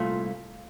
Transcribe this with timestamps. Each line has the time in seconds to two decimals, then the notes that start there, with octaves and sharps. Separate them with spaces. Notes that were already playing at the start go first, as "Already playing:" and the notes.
Already playing: C2 A#2 A3 F4